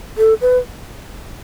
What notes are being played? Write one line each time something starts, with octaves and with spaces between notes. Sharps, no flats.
A4
B4